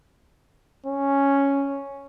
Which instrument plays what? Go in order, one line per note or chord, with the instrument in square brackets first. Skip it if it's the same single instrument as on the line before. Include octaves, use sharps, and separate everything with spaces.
[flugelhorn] C#4